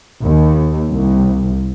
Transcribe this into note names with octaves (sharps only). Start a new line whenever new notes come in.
D#2
C2